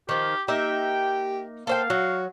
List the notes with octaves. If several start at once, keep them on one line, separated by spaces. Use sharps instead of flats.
D#3 F3 G4
A#3 D#4 G4 E5 G5
A#3 A4 C5 F5 G5
F#3 F#4